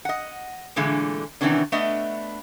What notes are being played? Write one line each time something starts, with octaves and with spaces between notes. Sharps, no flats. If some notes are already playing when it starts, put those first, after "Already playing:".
D#5 F#5
A#2 D3 E3 G#3 A3
C3 D#3 E3 B3 C#4 D4
A3 B3 D4 D#5 E5